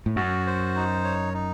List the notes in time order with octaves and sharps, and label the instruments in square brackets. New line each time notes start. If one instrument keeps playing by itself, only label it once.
[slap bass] A2
[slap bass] F#2 [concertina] F#4
[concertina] C5
D#4
C#5
D#4